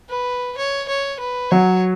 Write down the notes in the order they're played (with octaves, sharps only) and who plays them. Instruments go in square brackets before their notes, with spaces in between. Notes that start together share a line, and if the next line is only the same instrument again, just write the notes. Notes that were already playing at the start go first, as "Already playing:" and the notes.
[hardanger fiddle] B4
C#5
C#5
B4
[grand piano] F#3 [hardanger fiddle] C#5